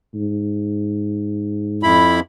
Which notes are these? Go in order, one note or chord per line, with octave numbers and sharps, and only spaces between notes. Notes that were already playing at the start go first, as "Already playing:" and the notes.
G#2
F2 E4 B5